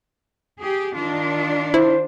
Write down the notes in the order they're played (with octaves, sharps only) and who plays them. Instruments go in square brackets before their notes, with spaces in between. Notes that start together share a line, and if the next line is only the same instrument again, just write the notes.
[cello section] G4 G#4
D#3 D4 F4
[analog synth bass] E4 [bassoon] C5